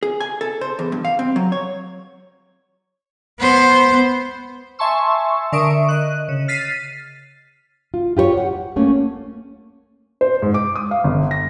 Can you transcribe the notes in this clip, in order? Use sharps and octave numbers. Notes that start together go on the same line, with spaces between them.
G#4
G#5
A4
C5
E2
G2
F5
C4
F#3
C#5
B3 C5
E5 G#5 A5 C6 C#6 E6
D3 A#4 E5 C#6 D#6 D7
D#5 F#6
C#3
F6 A6 B6 C7 D#7
F4
F4 G4 B4 C#5
F#5
A3 A#3 C#4
C5
G#2
D6
D#6
F5
G1
A#6